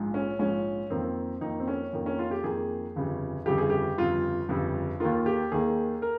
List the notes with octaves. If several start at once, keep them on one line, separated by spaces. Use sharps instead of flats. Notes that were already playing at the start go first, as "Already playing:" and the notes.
Already playing: A#1 G#2 F3
C#4
A#1 G#2 F3 C#4
F2 D#3 A#3 C4
F2 D#3 A#3 D#4
C4
C#4
F2 D#3 A#3
C#4
F4
G4
F2 D#3 A#3 G#4
G1 F2 C#3 G3
G1 F2 C#3 G3 G4
G#4
G4
G1 F2 C#3 G3 F4
G1 F2 C#3 G3
D#2 D#3 A#3 F4
G4
D#2 D#3 A#3 G#4
A#4